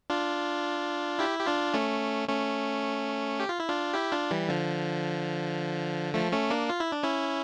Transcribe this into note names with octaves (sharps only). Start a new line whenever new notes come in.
D4 F4
E4 G4
G4
D4 F4
A3 C#4
A3 C#4
G4
F4
E4
D4 F4
E4 G4
D4 F4
E3 G3
D3 F3
F3 A3
A3 C#4
A#3 D4
F4
E4
D4
C#4 E4